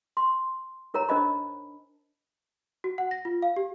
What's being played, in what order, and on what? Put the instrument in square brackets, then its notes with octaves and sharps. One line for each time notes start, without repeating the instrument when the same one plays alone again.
[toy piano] C6
D#4 A#4 C#5 A#5
D4 A#4 C5 D#5 A5 B5
[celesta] F#4
F#5
A#6
F4
F5
G4